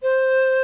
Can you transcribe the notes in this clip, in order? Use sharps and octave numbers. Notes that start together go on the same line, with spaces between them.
C5